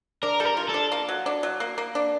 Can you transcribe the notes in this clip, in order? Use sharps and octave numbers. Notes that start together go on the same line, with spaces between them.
D4 A#4
G3 A4
A#4
F4
A4
D4
A#3
F#3
D4
F#3
A#3
A#3
D4